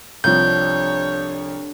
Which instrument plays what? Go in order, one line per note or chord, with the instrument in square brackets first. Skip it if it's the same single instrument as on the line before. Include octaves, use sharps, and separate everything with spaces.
[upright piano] C2 F3 [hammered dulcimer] D3 G4 [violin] C#5 [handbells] G6